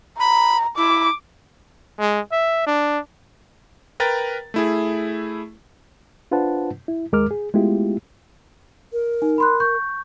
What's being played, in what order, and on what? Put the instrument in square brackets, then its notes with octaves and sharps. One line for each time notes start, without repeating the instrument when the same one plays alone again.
[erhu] A#5 [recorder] B5
[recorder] E4 [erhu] D6
[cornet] G#3
E5
D4
[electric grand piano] A#4 B4 G5 A#5 A6
A3 E4 G#4
[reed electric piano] D4 F4 B4 C5 F#5 A5
E4
D#2 G#3 A#4 D6 F6
G#4
G#3 A3 B3 E4 F4 G4
[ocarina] A#4
[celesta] D#4
B5 C6 F#6
C#6 G6